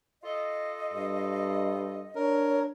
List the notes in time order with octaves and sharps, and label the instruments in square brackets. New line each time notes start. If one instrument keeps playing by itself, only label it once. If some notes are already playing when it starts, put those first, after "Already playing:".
[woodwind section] F4 A4 D#5
[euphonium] G2
[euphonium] D4 [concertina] A#4 [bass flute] C#5